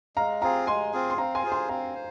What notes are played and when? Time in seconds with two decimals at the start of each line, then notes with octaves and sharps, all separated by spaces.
0.16 G#3 F5 A#5
0.42 C4 F4 G#4 F5 A#5
0.67 G#3 G#5 C6
0.93 C4 F4 G#4
1.10 C6
1.18 C4 F5 A#5
1.35 G#5 C6
1.43 F4 G#4 C5
1.52 G#5 C6
1.69 C4 F5 A#5
1.95 C5